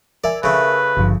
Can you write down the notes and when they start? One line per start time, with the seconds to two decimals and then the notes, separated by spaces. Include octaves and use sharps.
0.24 A#4 D5 E5 G#5
0.43 C#3 A3 B4
0.96 G#1 G2 D3 F3